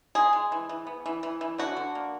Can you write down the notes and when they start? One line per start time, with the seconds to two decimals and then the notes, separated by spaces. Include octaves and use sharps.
0.15 G#3 G#4
0.33 G#3
0.52 E3
0.69 E3
0.87 B3
1.06 E3
1.23 E3
1.41 E3
1.58 D3 F#4
1.77 D3
1.95 A#3